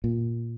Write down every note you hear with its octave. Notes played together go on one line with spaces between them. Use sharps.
A#2